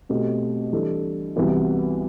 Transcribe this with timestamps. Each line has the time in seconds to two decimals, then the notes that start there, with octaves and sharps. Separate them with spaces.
0.09 B2 A3 C4 G4
0.73 E3 G3 D4 A4
1.36 C2 C3 E3 B3 F#4